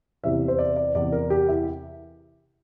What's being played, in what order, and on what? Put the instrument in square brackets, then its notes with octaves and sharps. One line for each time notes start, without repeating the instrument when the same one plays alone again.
[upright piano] E2 C3 E3 E5
C5
D5
D5
E2 C3 E3 D5
A#4
G4
E4